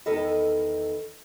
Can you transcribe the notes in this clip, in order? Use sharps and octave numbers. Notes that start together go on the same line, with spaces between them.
E2 D#3 A4 B4 D#5